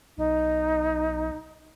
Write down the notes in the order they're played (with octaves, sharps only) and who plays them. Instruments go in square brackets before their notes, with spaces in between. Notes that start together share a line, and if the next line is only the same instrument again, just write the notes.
[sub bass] B1 [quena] D#4